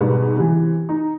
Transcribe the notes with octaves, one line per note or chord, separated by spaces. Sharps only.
G#2 B2 G3 B3
C3 E3
D#4